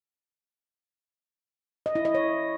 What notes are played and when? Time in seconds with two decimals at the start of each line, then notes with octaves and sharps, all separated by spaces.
1.86 D#5
1.95 E4
2.05 D#5
2.14 C#5